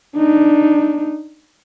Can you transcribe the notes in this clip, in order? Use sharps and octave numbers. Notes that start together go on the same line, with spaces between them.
D4 D#4